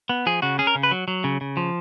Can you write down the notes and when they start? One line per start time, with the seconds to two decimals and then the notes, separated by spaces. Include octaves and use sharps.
0.09 B3
0.26 F3 G#4
0.42 C#3 F#4
0.59 C#4 G#4
0.67 A#4
0.75 C#3
0.83 B4
0.91 F#3
1.08 F#3
1.24 C#3
1.41 C#3
1.57 F3